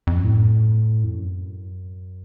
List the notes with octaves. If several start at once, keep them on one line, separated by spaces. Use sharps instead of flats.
F2
F#2
A2
F2
F#2